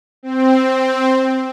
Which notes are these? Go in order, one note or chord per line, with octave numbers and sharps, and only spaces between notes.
C4